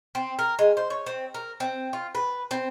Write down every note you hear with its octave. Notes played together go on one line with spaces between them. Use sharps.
C4
A#4
G#3
C5
C#5
C4
A#4
C4
F4
B4
C4